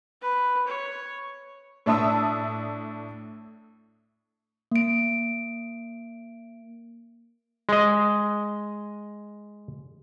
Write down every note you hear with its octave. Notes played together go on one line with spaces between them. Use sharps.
B4
C#5
A2 D4 E5 A5 D#6 E6
A#3 D7
G#3 D#5